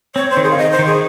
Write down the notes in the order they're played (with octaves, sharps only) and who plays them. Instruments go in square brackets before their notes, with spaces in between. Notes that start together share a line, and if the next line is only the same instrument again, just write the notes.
[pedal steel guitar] C4 [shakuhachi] C#5
[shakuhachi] C5
[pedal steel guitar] D#3
[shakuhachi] G#4
F5
[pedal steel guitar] D#3 [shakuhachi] D#5
[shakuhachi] C5
[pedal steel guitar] D#3
[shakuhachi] G#4